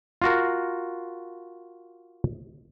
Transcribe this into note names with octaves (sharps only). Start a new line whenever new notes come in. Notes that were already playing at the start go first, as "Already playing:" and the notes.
F4 F#4 A#4